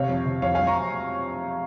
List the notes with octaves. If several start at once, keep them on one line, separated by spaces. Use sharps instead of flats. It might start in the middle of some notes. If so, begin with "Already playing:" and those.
Already playing: C3 C#5 F5
F2
C3
F2 C#5 F5
F#3 F5 G#5
A#5 C#6